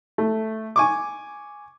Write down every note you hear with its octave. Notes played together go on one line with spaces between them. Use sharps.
A3
G#5 C#6 D6